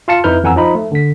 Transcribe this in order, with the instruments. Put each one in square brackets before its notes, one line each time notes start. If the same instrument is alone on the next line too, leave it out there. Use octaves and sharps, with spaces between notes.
[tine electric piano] F4 F5 A5 C#7
F2 D#4 E4 B4 F6 G6
F2 E3 F#5 G#5 A#5 E6
F3 D#4 B5
A3
D3 B6